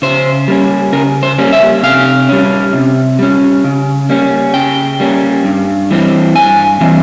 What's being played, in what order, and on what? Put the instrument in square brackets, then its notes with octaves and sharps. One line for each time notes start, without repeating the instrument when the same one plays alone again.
[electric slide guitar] C#3 C5
G3 A#3 C#4
C#3 A#4
C5
G3 A#3 C#4
E5
C3 F5
G3 C#4
C3
G3 C#4
C#3
G3 A#3 C#4
C#3 G5
G3 A#3 C#4
G2
E3 G3 C4
G2 G#5
E3 G3 C4